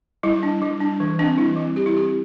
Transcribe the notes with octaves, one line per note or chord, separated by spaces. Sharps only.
G3 E4
D4
G3
D4
E3
G3 C4 D4
E3 E4
G3 C4
E3 G4
E4
C4 G4